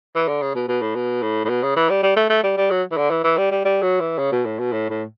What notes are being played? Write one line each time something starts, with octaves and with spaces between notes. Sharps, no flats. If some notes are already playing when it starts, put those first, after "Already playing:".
E3
D3
C#3
B2
B2
A2
B2
A2
A2
B2
C#3
E3
G3
G3
A3
A3
G3
G3
F#3
E3
D3
E3
E3
G3
G3
G3
F#3
E3
C#3
B2
A2
B2
A2
A2